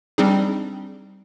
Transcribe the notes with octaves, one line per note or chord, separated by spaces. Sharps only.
G3 C4 D4 D#4 G#4